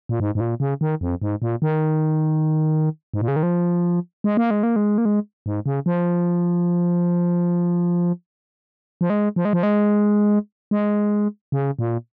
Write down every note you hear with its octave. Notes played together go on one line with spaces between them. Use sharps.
A#2
G#2
G#2
A#2
C#3
D#3
F2
G#2
A#2
D#3
G#2
A#2
C#3
D#3
F3
G#3
A#3
G#3
A#3
G#3
A#3
G#3
G#2
C#3
F3
F3
G#3
F3
G#3
F3
G#3
G#3
C#3
A#2